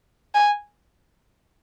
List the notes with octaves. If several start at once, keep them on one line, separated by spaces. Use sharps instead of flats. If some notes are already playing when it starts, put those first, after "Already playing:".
G#5